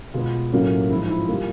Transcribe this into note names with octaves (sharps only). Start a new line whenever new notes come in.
B2 G#3 B3 F4
A2 F#3 A#3 C#4
G#2 F3 G#3 E4
D#4
E4
F4
A#2 G3 A#3